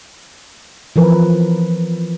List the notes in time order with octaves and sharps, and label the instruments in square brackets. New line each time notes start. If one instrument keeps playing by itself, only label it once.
[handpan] E3 F3 A#4 B4